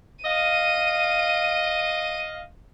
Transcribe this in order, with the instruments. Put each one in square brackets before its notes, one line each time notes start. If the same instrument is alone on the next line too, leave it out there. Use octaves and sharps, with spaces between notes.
[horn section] D#5 F5 [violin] D#7